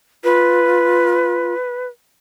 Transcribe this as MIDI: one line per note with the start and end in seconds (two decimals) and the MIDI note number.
0.24 1.55 65
0.24 1.87 71